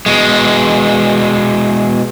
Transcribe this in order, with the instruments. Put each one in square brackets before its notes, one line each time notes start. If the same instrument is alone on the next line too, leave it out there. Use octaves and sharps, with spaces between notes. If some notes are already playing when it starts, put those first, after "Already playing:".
[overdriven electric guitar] B2 G#3